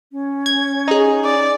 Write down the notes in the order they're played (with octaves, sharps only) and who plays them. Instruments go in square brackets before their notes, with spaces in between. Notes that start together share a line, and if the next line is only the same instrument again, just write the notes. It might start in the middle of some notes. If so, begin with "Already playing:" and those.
[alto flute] C#4
[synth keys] G#6
D#4 G#4
[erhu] D5